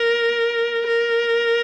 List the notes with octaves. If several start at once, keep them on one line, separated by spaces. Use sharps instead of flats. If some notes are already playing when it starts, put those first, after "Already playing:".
Already playing: A#4
A#4